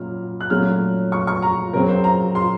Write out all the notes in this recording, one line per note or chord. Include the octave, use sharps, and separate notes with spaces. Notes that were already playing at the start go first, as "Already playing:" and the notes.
Already playing: A#2 F#3 C#4 F6
F#6
A#2 F#3 A3 C#4 F6
C#6
C#6
A#5
C#3 F#3 C4 A#4
C5
A#5
C6